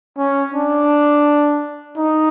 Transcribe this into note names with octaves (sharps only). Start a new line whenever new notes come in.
C#4
D4
D#4